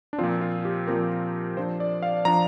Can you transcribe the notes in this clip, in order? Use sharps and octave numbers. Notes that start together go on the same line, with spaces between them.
D4
A#2 F3 C4 F4
F4
G4
A#2 F3 C4 A#4
F3 D4 C5
D5
F5
F3 D4 A#5